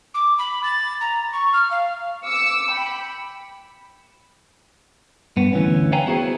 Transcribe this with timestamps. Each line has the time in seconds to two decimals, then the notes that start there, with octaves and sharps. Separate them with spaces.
0.14 D6
0.38 B5
0.63 A6
1.00 A#5
1.32 C#6
1.53 F6
1.71 F5
2.24 D6 E6 C#7
2.71 G5 B5
5.37 G2 B3
5.53 D2 E3 C#4
5.92 B4 C#5 F5 G5 G#5 A#5
6.06 B3 E4 F#4 G#4 C5